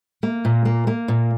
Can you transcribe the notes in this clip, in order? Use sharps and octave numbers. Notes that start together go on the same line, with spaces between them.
A#3
A#2
A#3
A#3
A#2